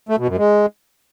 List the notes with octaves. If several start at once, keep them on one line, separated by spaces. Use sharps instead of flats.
A3
B2
F#2
G#3